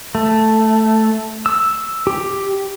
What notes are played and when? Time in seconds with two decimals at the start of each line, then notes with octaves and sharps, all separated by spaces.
0.15 A3
1.46 E6
2.07 G4